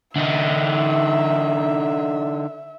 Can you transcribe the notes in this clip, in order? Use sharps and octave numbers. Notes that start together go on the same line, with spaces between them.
D3 D#4 E5